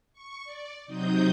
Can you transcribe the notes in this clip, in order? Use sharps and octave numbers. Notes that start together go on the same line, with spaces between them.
C#6
D5
C3 F#3 C4 D#4 D#6 G6